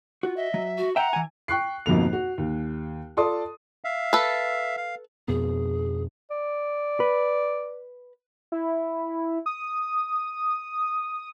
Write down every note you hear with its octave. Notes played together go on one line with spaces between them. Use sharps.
F4 F#4
D#5 E5
F#3
F#4
E5 F#5 G5 A#5
E3 G#5
G5 C#6 F#6 C7
G#1 F2 B2 A#3 F7
F#4
D#2
F4 A4 D5 A5 C6 D#6
E5 F5
A4 B4
F5
F2 B2 B3 G#4
D5
B4
E4
D#6